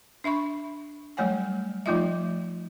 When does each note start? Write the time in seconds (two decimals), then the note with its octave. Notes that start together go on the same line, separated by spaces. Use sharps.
0.24 D4 E5 B5 C#6
1.17 F#3 G3 A3 C#5 F#5 G#5
1.86 F3 A3 D#4 F4 D#5 E5